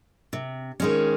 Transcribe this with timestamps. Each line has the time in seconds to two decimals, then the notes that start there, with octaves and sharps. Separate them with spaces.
0.33 C3
0.80 D#3 G#3 C#4